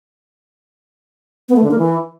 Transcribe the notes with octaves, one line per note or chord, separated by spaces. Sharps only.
B3
A3
D3
A#3
E3